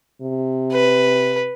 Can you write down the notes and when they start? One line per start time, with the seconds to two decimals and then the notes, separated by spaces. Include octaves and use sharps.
0.22 C3
0.72 B4